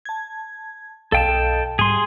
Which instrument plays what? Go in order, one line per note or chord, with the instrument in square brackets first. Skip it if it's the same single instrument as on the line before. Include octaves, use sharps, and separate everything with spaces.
[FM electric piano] A5 G#6
[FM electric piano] B1 D#5 F5 [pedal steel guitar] A4 G5 A5
[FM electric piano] G#2 G3 [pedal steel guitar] G#4 C6